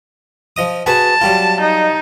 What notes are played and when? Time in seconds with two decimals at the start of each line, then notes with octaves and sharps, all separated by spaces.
0.56 F3 D#5 D#6
0.86 F#4 G#4 B4 A5
1.21 F#3 G3 F4
1.61 D#4